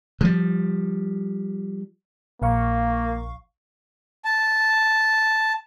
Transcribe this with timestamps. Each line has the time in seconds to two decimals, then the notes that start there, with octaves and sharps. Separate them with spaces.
0.21 F3 G3
2.42 A#1 A#3 F5 C#6
4.25 A5